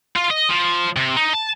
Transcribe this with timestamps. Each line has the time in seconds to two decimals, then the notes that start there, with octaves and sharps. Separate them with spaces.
0.16 F4
0.31 D#5
0.50 F3
0.96 C3
1.16 D#4
1.33 A5